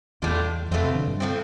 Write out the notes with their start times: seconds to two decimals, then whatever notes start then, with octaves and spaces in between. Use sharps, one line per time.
0.22 E2 A2 G3 D4 F4
0.71 F2 B2 A3 C4 F4
0.84 C3
0.95 D3
1.07 G2
1.20 A2 F3 C4